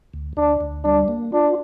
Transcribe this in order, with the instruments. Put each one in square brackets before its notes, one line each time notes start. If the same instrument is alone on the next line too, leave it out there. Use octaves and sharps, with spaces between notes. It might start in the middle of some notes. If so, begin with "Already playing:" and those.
[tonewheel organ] D2
[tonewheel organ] D2 [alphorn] D4
[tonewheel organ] D2
[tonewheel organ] G3 [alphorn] D4
[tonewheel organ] A#3
[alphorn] D4 [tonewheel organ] F4